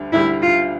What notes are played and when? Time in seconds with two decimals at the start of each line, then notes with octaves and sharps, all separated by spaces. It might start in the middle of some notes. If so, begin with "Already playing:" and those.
Already playing: D2 D3 G3
0.12 D2 D3 G3 E4
0.43 F4